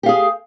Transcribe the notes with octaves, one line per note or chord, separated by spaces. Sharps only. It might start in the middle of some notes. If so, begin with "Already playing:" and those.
G4 G#4 F5